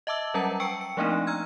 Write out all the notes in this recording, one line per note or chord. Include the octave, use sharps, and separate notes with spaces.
D#5 E5 A5 D6 E6
F#3 G3 C#4 A#4 F#5 A#5
G5 C#6 E6 C#7 D7
C#7
F3 A3 A#3 C4 D4 D#4
A#5 E6 F6 G#6